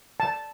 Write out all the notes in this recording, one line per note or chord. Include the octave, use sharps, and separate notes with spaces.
A5